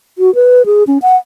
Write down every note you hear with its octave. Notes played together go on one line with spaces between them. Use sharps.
F#4
B4
G#4
C#4
F#5